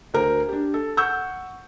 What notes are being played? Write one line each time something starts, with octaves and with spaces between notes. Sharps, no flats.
D2 A#4 C5
D4 G4
A4
F#5 C#6 E6 G6